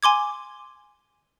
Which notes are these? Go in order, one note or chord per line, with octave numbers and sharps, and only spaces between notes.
G#5 C6 D6 G#6